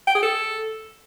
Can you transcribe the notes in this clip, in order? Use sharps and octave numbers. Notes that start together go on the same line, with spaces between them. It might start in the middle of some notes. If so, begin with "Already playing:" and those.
G5
G#4
A4